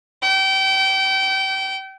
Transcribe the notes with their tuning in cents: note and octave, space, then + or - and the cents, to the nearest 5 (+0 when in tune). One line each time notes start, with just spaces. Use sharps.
G5 -30